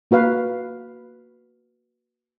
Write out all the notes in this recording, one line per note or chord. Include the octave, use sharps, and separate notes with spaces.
A#3 F#4 B4 F5